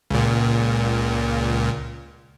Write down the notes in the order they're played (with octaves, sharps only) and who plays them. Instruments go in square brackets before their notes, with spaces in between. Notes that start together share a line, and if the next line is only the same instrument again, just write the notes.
[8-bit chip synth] C#2 A#2